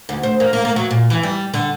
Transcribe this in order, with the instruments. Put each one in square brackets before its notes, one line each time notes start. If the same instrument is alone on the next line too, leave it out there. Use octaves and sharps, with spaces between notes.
[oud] D2
C5
A#3
A#3
A#3
F#3
A#2
E3
G3
D3